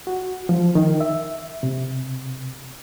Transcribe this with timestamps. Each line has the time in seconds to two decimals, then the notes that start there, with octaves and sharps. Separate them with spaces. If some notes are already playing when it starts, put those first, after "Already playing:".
0.07 F#4
0.49 F3
0.75 D#3
1.01 E5
1.63 C3